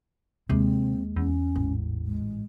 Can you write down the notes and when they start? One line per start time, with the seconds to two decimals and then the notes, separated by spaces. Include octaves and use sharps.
0.49 D#2 C3 G#3 C4
1.16 E2 C#4
1.56 A1 G#2
2.06 G#3